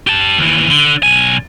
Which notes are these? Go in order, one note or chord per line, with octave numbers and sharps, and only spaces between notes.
G4 A5
D#2 E3
D3
B1 G#5